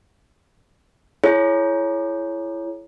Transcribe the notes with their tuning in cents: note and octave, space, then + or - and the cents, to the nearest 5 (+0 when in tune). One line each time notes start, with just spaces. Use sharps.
E4 +25 G#4 +45 C#5 +0